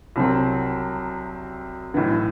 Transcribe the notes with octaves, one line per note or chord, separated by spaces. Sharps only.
C2 C3 F#3 C4
B1 A2 E3